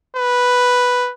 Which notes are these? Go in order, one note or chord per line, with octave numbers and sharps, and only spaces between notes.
B4